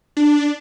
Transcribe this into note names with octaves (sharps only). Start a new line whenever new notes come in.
D4